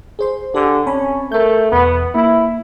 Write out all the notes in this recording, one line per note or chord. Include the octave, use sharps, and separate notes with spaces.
G#4 C5 C6
D3 G4 G#5
C4 C#4 A5 B5
A3 A#4 G6
E2 B2 B3
A#3 E4